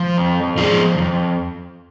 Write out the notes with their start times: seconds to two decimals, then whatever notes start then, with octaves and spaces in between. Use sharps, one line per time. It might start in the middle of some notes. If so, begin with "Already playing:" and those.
Already playing: F3
0.18 F2
0.57 F3 F4 G#4
0.98 F2